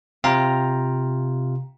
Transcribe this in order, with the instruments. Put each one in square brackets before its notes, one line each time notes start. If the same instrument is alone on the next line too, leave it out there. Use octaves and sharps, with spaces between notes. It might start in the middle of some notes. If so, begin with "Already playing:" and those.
[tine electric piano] C3 F4 F5 [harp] G5 A#5